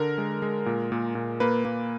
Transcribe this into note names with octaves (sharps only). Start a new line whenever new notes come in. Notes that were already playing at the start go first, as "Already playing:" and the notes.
Already playing: D3 A#4
G#3
G#3
A#2
A#2
A#2
A#3 B4
A#3